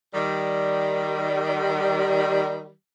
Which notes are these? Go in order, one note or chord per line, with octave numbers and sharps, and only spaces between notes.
D#3 G3